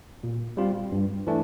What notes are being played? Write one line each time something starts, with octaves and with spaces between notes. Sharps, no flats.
A#2
G3 C4 F4
G2
E3 A3 D4